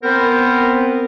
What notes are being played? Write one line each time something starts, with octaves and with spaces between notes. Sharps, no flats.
B3 C4 A#4 C5